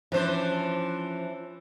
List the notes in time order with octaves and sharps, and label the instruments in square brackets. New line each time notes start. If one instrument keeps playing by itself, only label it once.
[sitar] E3 D4 C5 [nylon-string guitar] F3 C#4